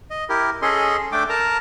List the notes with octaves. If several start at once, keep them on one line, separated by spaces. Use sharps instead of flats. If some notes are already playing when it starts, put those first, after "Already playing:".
D#5
E4 G4 A#4
C#4 G#4 A4 D#5 C6
A3 D4 G5 D6
A#4 A5 A#5